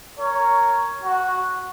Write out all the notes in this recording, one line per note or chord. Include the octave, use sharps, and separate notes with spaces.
A#4 C#5
F#4